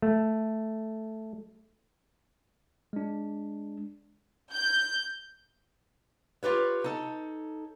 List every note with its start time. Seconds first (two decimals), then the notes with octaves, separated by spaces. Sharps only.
0.02 A3
2.93 G#3 D4
4.54 G6
6.43 F4 G4 B4 C#5
6.84 D#4 A4 C#5